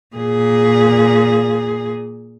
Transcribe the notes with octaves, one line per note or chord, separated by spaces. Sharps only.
A#2 G#4